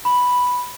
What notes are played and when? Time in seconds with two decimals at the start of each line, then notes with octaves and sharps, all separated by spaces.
0.05 B5